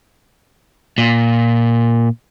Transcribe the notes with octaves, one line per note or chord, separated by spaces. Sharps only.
A#2